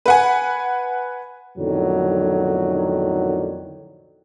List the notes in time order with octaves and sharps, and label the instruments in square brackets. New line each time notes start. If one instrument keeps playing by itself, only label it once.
[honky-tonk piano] B4 F#5 G#5
[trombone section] B1 F2 A2 D3 D#3 F#3